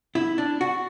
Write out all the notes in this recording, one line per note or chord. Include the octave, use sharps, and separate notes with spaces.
E4
D4
F#4